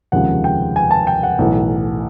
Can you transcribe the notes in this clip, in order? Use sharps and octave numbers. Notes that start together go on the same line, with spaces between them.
F1 D#2 C#3 F3 G#3 F#5
G5
G#5
A5
G5
F#5
B1 A2 E3